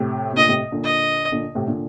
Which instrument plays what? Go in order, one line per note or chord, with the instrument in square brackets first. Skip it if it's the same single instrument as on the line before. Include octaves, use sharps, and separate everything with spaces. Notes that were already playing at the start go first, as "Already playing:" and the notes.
Already playing: [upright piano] A2 C3
C3
[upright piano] A#2 D3 [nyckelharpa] D#5
[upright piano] A2 C3
A#2 D3
[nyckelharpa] D#5
[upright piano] A#2 D3
A2 C3
A#2 D3